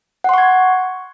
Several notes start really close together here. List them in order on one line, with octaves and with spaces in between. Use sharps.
F#5 C6 C#6 G#6